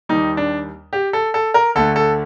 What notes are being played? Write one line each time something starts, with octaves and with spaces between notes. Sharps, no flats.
D#2 D#3 G3 D#4
D4
G4
A4
A4
A#4
D2 D3 A3 A4
A4